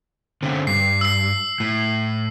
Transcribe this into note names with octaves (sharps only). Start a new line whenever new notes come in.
D3 C4 C#4
G2 C7
E6 C7
A2